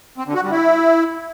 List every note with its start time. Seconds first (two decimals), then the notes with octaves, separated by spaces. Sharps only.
0.18 C4
0.26 D3
0.35 F#4
0.43 G3
0.51 E4